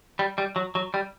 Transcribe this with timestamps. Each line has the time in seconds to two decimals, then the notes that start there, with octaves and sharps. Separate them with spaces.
0.19 G3
0.38 G3
0.56 F#3
0.75 F#3
0.94 G3